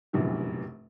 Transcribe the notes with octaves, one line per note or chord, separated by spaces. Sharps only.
F1 A#1 F#2 B2 D3 E3